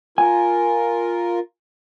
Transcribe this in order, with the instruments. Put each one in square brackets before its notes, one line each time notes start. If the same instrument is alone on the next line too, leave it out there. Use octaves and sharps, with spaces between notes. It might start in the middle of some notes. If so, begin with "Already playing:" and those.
[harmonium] F4 A#4 [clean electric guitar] G#5